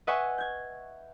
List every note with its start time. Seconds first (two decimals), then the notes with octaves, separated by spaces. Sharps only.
0.07 B4 D#5 E5 F#5 G#5 C#6
0.38 G6 G#6